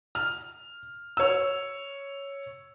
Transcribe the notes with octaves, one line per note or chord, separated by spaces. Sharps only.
F6
C#5 E6